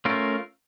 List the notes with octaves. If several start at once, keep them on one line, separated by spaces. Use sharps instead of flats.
A3 C#4 F4 A#4